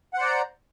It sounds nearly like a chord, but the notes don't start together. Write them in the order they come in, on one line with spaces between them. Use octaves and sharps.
F#5 C5 D5 A#5